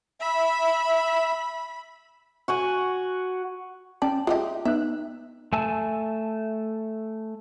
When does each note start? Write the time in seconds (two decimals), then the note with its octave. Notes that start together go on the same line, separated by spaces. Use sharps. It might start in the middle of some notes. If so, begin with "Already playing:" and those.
0.21 E5 B5
2.48 F#4 F#5 G#5
4.02 C#4 D5 G5 A5
4.27 G#3 D#4 F4 G4 D#5 E5
4.65 B3 D#4 E5 F#6
5.53 A3 G#5 A5 E6